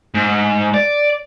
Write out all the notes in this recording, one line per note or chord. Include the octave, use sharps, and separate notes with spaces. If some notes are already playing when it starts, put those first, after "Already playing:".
G#2
D5